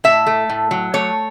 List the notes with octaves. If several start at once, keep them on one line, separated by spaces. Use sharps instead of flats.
A2 E5
A3
A2
F#3
A3 C#5